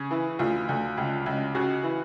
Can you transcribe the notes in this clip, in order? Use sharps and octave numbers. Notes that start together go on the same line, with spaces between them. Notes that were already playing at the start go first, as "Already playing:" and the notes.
Already playing: C#3
E3
D2 F4
D2
C#2
C#2
C#3 F#4
E3